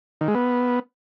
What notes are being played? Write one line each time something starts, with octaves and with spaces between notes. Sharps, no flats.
D#3
G#3
B3